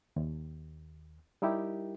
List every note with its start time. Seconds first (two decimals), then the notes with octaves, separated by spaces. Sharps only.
0.16 D#2
1.42 G3 D#4 E4 G4 A#4